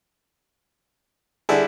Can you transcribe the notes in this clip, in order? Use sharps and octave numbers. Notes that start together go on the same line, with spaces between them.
D3 G3 E4 G#4 A4 D5